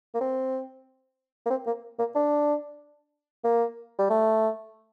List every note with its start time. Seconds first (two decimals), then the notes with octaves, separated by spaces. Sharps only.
0.14 A#3
0.21 C4
1.46 A#3
1.50 C4
1.66 A#3
1.99 A#3
2.15 D4
3.44 A#3
3.99 G3
4.10 A3